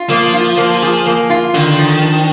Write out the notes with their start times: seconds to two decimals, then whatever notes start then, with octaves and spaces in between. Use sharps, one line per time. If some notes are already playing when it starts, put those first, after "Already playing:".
Already playing: F4
0.10 F3 A#3
0.34 F4
0.58 A#3
0.82 G#4
1.06 A#3
1.30 F4
1.54 D3 D#3
1.79 F3
2.02 D4